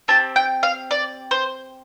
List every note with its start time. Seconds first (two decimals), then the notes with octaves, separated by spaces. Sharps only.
0.08 C4 G4 A5
0.36 G5
0.63 F5
0.91 D5
1.31 C5